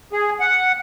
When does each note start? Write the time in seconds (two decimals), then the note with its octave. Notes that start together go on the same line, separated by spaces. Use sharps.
0.13 G#4
0.40 F#5